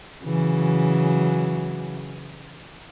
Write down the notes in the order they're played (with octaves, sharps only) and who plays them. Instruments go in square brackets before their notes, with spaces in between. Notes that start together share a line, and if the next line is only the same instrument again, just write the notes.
[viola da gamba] C#3 E3 F#3